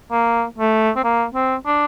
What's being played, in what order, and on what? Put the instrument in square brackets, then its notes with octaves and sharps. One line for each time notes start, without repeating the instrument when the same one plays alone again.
[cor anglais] A#3
A3
C4
A#3
C4
D4